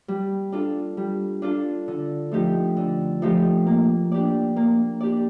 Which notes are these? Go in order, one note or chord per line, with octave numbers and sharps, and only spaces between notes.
G3
D4 F4 A4
G3
D4 F4 A4
D3
F3 A3 D#4 G4
D3
F3 A3 D#4 G4
A#3
D4 G4 D5
A#3
D4 G4 D5